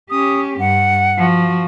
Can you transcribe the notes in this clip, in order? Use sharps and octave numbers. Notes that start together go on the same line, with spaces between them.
C#4 G4 D#6
G2 F#5
F3 F#4